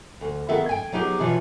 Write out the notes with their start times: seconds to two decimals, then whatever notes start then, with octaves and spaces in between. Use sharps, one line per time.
0.21 D2
0.49 D#3 B3 G#4 A4 E5
0.69 G5 G#5
0.92 F#3 B3 D#4 G4 G#4
1.20 B2 E3 F3 B4 C#5